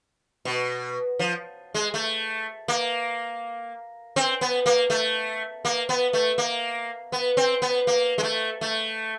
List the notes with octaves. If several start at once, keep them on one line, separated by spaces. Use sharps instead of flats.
B2
F3
G#3
A3
A#3
C4
B3
A#3
A3
A#3
B3
A3
A#3
B3
C4
B3
A#3
G#3
A3
A3